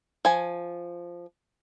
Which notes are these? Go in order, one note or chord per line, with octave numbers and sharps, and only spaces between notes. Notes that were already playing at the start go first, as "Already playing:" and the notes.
F3 G#5